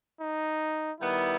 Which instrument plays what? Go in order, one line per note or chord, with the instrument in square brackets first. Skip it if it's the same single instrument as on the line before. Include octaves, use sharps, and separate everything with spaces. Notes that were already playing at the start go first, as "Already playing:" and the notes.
[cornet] D#4
[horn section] D#3 G3 B3 [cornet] E4